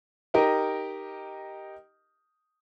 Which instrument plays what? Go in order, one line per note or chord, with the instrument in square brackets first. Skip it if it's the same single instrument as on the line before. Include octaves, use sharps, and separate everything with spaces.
[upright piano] D#4 G4 A#4 D#5